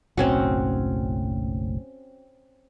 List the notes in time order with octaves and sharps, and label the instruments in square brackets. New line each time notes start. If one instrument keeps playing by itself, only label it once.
[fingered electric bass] F#1 B1 A2 [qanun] C4 C#4 F#4